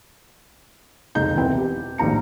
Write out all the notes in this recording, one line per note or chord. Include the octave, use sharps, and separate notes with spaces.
F1 C#2 G#3 D#4 G6
E1 B3 C4 E4 G5
G4
A#1 D#2 A2 A#5 C#7